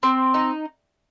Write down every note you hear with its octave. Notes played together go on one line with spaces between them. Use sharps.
C4
D#4